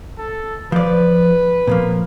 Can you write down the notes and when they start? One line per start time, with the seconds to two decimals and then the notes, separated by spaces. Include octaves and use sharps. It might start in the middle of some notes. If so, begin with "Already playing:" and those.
0.18 A4
0.72 F3 B4 D5
1.67 A#2 F3 A#3